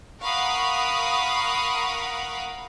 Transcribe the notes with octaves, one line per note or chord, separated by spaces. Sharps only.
A#4 F5 F#5 B5 C#6 D#6